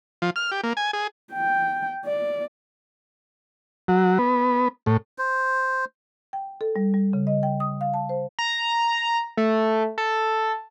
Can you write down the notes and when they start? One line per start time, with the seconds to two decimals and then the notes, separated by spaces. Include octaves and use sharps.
0.22 F3
0.36 F6
0.51 G4
0.63 A#3
0.77 G#5
0.93 G#4
1.32 G5
2.05 D5
3.88 F#3
4.18 B3
4.86 A2
5.18 C5
6.33 G5
6.61 A4
6.76 G3
6.94 G3
7.13 C#3
7.27 D#5
7.43 G5
7.60 D#6
7.81 F5
7.94 A5
8.09 C5
8.39 A#5
9.37 A3
9.98 A4